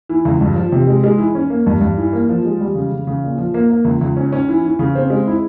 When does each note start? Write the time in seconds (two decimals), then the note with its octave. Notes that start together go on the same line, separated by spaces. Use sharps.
0.09 E3
0.25 C#2
0.41 G2
0.56 F3
0.72 C3
0.87 G#3
1.04 G#3
1.18 E3
1.35 C#4
1.50 A#3
1.66 G2
1.81 G2
1.98 E3
2.13 A#3
2.29 F3
2.45 G#3
2.60 G3
2.75 C#3
2.92 C#3
3.07 C#3
3.23 A#2
3.38 F3
3.54 A#3
3.70 A#3
3.85 C#2
4.01 C#2
4.17 C#4
4.32 C#4
4.49 E3
4.64 E3
4.79 C#3
4.95 C4
5.10 G#3
5.27 E4